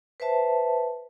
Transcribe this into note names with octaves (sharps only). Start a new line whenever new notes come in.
B4 C5 E5 A5